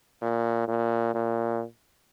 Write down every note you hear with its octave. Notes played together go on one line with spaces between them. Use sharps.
A#2
A#2
A#2